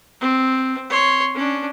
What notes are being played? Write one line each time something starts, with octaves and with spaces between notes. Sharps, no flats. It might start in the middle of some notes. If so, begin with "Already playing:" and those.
C4
C#5 C6
C#4 D4